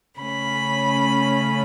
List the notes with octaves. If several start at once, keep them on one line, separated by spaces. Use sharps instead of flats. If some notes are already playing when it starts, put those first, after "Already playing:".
C#3 A3 C#4 B5